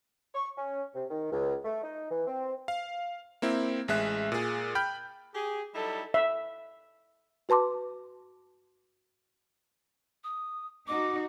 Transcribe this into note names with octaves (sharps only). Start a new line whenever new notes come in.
C#6
C#4
C3
D#3
C#2
A3
D#4
E3
C4
F5
A#3 C4 E4
A1 G#3 E5 F#6
A#2 G#4
G5 B5 F6 G6
G4 G#4
F#3 G3 D#4 E4 A4
E5
F#4 B4 A5 C6 D6
D#6
D#4 F#4 D6